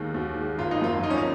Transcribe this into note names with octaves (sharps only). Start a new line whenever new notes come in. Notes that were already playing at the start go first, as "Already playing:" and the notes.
Already playing: D#2 D#3 G#3
D#2 F#4
D#3
G#3
G#1 F4
D#4
F#2 F3 A#3 F4
G#1 D#4
C#4
D#4